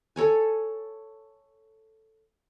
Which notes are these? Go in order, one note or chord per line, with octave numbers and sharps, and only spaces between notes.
A4 C#5 G#5